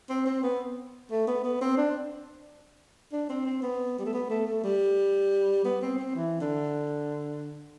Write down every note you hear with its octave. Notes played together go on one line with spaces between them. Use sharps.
C4
C4
B3
A3
B3
B3
C4
D4
D4
C4
C4
B3
G3
A3
B3
A3
A3
G3
B3
C4
C4
E3
D3